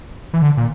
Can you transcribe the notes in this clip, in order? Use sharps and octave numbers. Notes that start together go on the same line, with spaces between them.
E3
D3
A#2